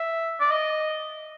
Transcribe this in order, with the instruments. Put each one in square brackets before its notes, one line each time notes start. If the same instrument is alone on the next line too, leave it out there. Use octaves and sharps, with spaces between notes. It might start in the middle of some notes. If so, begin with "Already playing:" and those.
Already playing: [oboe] E5
D5
D#5